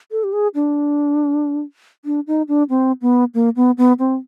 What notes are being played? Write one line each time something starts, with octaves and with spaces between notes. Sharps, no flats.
A4
G4
G#4
D4
D4
D#4
D4
C4
B3
A#3
B3
B3
C4